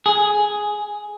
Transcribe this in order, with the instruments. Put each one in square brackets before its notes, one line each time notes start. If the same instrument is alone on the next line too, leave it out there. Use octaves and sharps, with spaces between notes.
[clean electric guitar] G#4